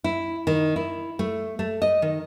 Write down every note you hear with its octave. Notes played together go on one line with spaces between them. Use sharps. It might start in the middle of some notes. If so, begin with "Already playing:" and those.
E4
D#3
E4
A3
A3
D#5
D#3